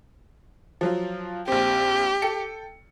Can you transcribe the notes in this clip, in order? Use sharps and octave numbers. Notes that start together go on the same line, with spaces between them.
F3 F#3 F4
A#1 C4 G4
A4 G5 C#7